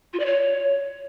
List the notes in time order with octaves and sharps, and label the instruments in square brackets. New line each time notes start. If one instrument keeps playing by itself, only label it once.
[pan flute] F4
D5
C#5